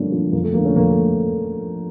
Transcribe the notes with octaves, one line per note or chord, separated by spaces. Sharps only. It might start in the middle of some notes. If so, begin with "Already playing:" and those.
Already playing: G2 D3 F3 A3 A#3 C#4 D4
D3 F3
F2 A#3
A3
D3 F3 A#3
A3 C#4
F2 A#3
A3